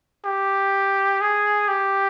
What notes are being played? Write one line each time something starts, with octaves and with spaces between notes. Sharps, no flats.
G4
G#4
G4